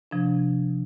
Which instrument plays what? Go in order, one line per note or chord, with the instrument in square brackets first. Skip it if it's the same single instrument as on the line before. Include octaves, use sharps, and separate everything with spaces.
[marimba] C3 F3 D4